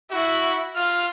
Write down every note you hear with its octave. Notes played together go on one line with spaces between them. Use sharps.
E4 F#4
F4 F6